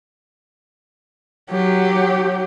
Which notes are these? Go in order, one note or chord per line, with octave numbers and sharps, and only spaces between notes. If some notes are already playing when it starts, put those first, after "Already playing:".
F#3 G4